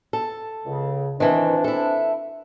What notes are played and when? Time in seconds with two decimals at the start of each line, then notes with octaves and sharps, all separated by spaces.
0.13 A4
0.66 C#2 C#3
1.20 D#3 E3 C4 D4
1.64 E4 A4